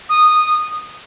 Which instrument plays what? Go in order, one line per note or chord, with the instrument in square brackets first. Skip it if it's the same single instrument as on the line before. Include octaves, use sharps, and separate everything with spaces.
[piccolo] D#6